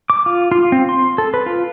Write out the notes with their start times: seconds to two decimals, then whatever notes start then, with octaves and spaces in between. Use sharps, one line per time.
0.10 D6
0.26 F4
0.51 F4
0.72 C4
0.89 C6
1.18 A4
1.34 B4
1.46 F4